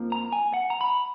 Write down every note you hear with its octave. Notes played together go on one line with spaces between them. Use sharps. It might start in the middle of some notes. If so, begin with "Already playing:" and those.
Already playing: F2 F3 A#3
A#5
G#5
F#5
A#5
B5